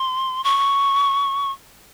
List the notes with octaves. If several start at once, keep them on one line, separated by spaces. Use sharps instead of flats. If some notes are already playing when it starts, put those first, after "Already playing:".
Already playing: C6
C#6